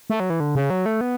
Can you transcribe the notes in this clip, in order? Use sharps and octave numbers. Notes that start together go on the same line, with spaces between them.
A3
F#3
E3
D3
C#3
F#3
A3
B3